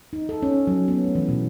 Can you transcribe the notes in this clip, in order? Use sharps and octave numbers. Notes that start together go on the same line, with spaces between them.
D#4
A4
C#4
F#3
B3
A3
E3
B2